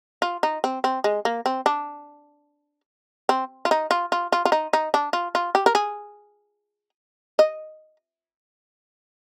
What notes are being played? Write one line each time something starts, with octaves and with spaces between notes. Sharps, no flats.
F4
D#4
C4
C4
G#3
A#3
C4
D4
C4
F4
D#4
F4
F4
F4
F4
D#4
D#4
D4
F4
F4
G4
A#4
G#4
D#5